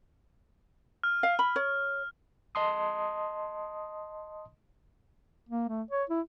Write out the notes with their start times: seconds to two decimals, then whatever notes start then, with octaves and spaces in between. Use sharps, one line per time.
1.03 F6
1.23 F5
1.39 B5
1.56 C#5
2.55 D#5 A5 C6 D#6
5.49 A#3
5.69 A3
5.91 C#5
6.10 E4